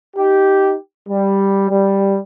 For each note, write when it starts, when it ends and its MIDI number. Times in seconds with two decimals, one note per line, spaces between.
0.17 0.75 63
0.17 0.75 67
1.09 1.69 55
1.71 2.18 55